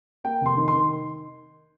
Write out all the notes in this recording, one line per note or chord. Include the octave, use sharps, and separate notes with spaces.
A#3 G5
F1 C6
D#3
C6
D#3